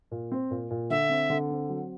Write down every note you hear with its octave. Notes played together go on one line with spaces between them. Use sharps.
A#2
C4
A#2
A#2
D3 E5
C4
D3
C4
F#3